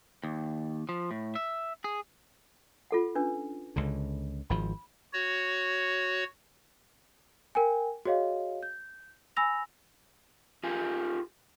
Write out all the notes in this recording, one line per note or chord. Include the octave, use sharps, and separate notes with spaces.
D#2
F3
A2
E5
G#4
F4 A4 F#5
C#4 D4 B4
C#2 D3
G#1 F3 B5
F#4 C#5
A#4 G5 G#5
F#4 G#4 C#5 D#5 F5
G6
G#5 B5 E6 A#6 F7
F4 G4 A#4 G#5